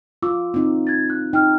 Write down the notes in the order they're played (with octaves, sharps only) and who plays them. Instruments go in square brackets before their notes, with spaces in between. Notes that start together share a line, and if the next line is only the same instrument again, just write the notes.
[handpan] F4 [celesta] D6 E6
[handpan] C4 D#4
[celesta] G#6 A6
F#6
[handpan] D#4 [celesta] G5 F6